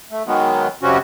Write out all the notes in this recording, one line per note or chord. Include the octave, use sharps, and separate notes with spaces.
A3
D#3 F#3 G#3 B3
F#2 C#3 G3 C4 C#4 F#4